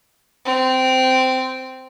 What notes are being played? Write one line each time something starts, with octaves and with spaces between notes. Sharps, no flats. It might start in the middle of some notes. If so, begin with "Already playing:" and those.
C4